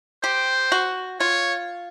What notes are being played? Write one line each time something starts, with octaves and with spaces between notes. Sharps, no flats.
G4 C5
F#4
F4 C#5